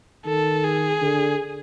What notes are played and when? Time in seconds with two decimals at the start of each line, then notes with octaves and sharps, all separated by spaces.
0.26 D#3 A4
0.64 G#4
1.02 D3